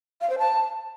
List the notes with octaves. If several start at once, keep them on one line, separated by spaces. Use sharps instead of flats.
F5
C5
A5